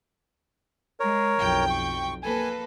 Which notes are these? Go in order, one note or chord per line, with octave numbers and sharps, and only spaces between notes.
G#3 A#4 C#5
B1 F2 G5
C#6
A#3 A4 B4 G#5